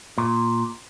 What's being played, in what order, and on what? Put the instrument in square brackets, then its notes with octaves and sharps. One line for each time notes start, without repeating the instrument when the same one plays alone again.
[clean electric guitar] A#2